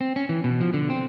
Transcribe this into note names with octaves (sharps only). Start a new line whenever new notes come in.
C4
C#4
E3
B2
F3
D3
C4